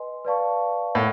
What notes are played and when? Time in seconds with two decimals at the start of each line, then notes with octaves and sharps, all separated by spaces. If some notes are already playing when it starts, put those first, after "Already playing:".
Already playing: B4 D#5 G#5 C6
0.25 B4 D5 F5 A5 C#6
0.95 A2 A#4 C#5 F#5